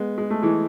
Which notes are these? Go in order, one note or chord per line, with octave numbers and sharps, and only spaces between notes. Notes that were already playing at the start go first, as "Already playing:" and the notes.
Already playing: G#3 B3
G#3
A3
E3 G#3